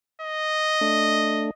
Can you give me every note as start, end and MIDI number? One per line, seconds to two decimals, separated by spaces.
0.21 1.52 75
0.81 1.51 57
0.81 1.51 62